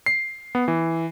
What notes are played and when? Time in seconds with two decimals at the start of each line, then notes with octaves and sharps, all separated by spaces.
0.06 C7
0.55 B3
0.68 E3